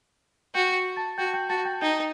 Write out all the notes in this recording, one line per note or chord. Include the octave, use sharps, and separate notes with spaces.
F#4 G5 G6
A5 A6
F#4 G5 G6
G5 G6
F#4 A5 A6
G5 G6
D#4 G5 G6